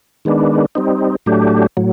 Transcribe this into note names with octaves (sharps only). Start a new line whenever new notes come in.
D#3 G#3 B3 D4
G3 C4 D#4
A2 F#3 A3 D4 G4
A2 F#3